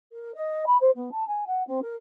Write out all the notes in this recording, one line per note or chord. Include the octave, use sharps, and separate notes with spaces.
A#4
D#5
B5
C5
B3
A5
G#5
F#5
C4
A#4